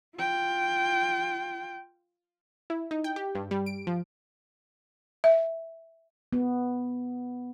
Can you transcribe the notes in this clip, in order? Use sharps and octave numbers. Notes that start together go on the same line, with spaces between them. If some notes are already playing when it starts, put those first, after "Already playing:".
F4 G5
E4
D#4
G5
G4
G2
G3
D7
F3
E5
B3